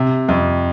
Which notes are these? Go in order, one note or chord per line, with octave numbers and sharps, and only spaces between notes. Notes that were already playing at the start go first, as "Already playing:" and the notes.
Already playing: C3
F2